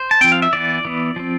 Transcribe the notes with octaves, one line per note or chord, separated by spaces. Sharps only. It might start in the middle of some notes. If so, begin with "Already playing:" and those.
Already playing: C5
A5
F3 C4 G5
F5
E5
E3 B3 D5
E3 B3
F3 C4